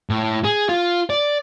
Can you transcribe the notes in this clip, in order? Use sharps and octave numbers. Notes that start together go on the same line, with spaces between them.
A2
G#4
F4
D5